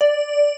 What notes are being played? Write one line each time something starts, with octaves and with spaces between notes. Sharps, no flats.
D5